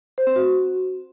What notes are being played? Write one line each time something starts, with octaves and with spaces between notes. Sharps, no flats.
C5
C4
F#4